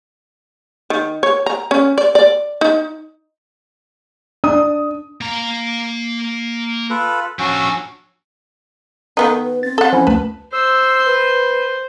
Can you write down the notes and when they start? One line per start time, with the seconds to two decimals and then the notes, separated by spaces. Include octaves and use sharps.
0.90 D#3
1.23 C#5
1.46 A#5
1.71 C#4
1.98 D5
2.15 D5
2.61 D#4
4.44 D4 D#6
5.21 A#3 A#5
6.90 F4 A4 B4
7.39 F3 C#4 D4 F#4 E6
9.17 D#3 B3 D#4 A4
9.44 B4
9.63 C4 A6
9.78 A4 F#5
9.93 F3 C#4 E4
10.07 D2 B4 A5
10.53 C5 E6
11.06 B4